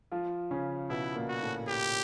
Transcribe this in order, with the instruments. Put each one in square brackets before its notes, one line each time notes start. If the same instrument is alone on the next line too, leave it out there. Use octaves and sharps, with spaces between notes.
[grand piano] F3 F4
C#3 C#4
[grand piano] B2 B3 [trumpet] E4
[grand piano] A#2 A#3
[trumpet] F#4
[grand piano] A2 A3
[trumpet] G4